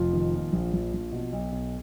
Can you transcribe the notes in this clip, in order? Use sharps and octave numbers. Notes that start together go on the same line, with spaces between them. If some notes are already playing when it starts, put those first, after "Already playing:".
Already playing: F1 F3 F4
D#3
A#2
A#1
A#1
A#1
B2
B1
B1